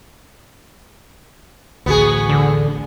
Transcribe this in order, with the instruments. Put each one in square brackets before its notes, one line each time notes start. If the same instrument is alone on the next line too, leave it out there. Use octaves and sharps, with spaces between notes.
[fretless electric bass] A1 D2 [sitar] B3 F#4 G#4
[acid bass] D3